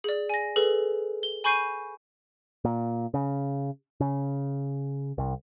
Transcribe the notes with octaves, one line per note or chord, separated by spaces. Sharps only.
G#4 D5
G#5 A#6
G#4 A4 B4
G7
G#5 B5 C#6 G6 C7 D#7
A#2
C#3
C#3
C2